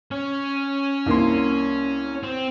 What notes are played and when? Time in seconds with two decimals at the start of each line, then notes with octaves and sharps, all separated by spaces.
0.11 C#4
1.06 C2 A#3 C6
2.23 C4